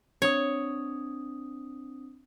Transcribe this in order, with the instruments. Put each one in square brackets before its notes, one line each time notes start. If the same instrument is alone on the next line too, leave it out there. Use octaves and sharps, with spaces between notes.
[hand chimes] C4 D4 D#6 [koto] C#5